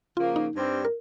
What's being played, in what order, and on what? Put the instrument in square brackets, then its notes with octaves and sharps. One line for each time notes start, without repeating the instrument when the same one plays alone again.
[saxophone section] C#3 F3 A#3 [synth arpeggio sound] F4
[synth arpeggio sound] D#4
[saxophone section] G2 G3 C4
[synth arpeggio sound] A#4